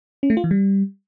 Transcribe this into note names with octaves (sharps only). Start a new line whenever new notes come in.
C#4
A3
F4
E3
G3